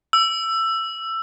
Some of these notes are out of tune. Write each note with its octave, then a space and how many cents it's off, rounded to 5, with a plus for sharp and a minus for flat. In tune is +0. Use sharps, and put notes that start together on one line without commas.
E6 +15